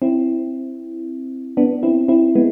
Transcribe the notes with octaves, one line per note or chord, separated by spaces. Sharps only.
C4 E4
B3 D4
C4 E4
C4 E4
G#3 B3